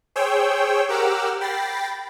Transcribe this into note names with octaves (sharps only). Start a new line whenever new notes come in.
G#4 C5 C#5 G5 E6
G4 A#4 F#5 D6 E6 F6
G5 B5 A6 A#6 C7